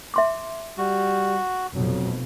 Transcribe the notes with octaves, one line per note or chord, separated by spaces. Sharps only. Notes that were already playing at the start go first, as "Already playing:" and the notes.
E5 C6 D6
G3 F#4
F1 F2 B2 F#3